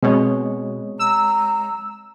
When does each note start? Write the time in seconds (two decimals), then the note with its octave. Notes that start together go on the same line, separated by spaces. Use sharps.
0.03 B2 G#3 C4 C#5 D#5
0.99 A#5 E6